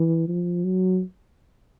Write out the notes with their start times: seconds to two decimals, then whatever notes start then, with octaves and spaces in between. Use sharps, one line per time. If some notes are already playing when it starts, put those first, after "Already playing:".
Already playing: E3
0.28 F3
0.64 F#3